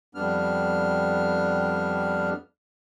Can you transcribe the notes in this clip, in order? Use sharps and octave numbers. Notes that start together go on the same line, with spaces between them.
F2 G3 B3 D4 F6